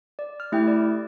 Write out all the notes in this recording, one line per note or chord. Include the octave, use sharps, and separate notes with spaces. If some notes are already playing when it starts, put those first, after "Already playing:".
D5
F6
A3 E4 G4 G5
D5